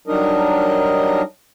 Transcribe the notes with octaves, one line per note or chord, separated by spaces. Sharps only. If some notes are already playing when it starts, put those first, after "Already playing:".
F#3 G3 D4 D#4 A#4 D#5